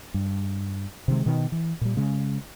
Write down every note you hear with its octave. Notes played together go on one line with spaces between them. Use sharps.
G2
C3 D#3 G#3
B2 D#3
E3
A#2 G3
C#3 G#3